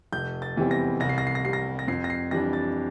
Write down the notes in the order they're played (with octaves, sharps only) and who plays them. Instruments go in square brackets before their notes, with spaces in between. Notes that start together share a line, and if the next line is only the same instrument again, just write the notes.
[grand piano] F1 G6
A6
E2 E3 G3 C4
A#6
C2 A#6
C7
A#6
C7
A#6
C3 G3 C7
A#6
A#6
F2 C7
A#6
C7
E3 G3 D4 A#6
A6